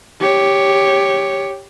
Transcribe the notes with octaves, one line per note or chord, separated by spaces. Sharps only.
G4 C#5